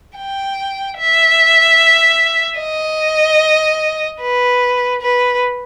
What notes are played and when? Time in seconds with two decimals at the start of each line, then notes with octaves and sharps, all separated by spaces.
0.18 G5
0.99 E5
2.59 D#5
4.21 B4
5.01 B4